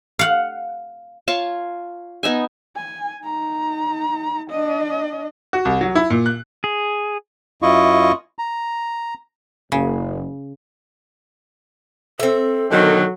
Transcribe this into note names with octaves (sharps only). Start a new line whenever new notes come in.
F5 F#5
F4 C#5 F5 A5
B3 D#4 E5 G#5
G#5
D#4 A#5
D4 D#5
F#4
C2
F#3
E4
A#2
F#6
G#4
F#2 E4 F4 D#5 C#6
A#5
F#1 C#3
C4 A4 E5
B2 D3 D#3 F#3 A4